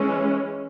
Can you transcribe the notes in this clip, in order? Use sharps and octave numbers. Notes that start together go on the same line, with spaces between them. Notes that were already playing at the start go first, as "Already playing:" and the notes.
Already playing: E3 G#3 C#4